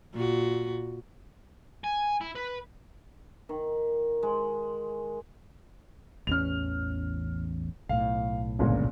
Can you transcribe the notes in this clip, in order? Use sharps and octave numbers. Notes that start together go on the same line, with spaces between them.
A#2 F#4
G#5
E4
B4
D#3
G#3
A1 E2 C#4 F6 F7
B1 A2 F5
G1 C#2 A#2